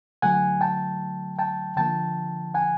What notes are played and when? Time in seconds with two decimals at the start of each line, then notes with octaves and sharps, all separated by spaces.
0.22 D3 F#3 A3 F#5 G#5
0.61 G5 A5
1.39 G5 A5
1.77 D3 F3 A#3 G5 A5
2.55 F#5 G#5